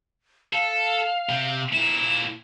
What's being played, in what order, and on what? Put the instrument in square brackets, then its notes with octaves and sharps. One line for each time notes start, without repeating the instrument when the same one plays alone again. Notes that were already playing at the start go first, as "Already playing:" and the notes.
[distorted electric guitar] A4 [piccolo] F5
[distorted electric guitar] C3
[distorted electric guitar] A#2 E4 [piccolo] E7